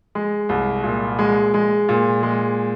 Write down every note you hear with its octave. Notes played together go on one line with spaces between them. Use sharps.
G#3
C2
A#2
G#3
G#3
A#2
G#3